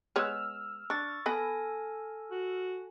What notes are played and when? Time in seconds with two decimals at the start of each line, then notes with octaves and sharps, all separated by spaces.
0.16 G#3 B3 C#5 E6 F6
0.90 D4 C#6 A6
1.26 B3 A4 G#5 B5 A#6
2.31 F#4